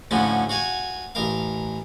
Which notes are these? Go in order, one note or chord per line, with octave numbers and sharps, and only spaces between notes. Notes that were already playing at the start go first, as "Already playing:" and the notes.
D2 A2 D3 F3 C#4 F#4
F#4 F5 G#5
A1 A#4 F5